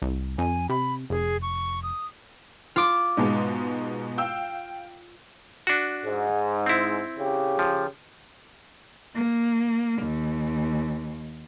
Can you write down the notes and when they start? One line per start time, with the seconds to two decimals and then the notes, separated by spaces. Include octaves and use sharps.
0.02 C2
0.38 F2 G#5
0.69 C3 B5
1.10 F1 G#4
1.42 C#6
1.83 D#6
2.76 F4 D6
3.17 G#2 B2 G#3
4.18 F5 G5 E6
5.67 D4 F#4
6.05 G#2
6.66 C4 E4
7.18 C#3 G4
7.59 F3
9.15 A#3
10.03 D#2